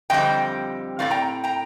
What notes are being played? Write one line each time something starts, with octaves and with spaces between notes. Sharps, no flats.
F2 D3 G3 C4 D#5 G5
A2 A3 C4 D5 F5
G5 A#5
G5 A#5